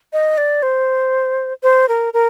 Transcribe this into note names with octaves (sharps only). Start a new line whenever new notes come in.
D#5
D5
C5
C5
A#4
A#4